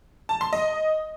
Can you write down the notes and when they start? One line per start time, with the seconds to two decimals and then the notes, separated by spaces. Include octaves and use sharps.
0.29 A5
0.41 C6
0.53 D#5